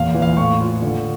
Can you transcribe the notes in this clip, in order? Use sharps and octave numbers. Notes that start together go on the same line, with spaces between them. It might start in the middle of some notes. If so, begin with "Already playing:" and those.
Already playing: E2 A#2 F5
E3
F5
A2 C#6
F4
D3